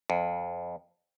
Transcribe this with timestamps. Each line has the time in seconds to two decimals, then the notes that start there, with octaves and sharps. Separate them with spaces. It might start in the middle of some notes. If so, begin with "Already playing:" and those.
0.10 F2